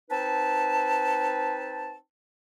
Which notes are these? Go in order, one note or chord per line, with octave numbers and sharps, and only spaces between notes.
C4 D#4 B4 A5